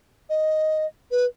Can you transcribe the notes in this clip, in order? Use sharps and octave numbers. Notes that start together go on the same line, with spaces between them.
D#5
B4